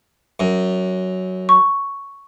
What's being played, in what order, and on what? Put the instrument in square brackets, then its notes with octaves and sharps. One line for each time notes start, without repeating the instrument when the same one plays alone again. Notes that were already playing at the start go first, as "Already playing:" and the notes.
[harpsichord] F#2
[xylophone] C#6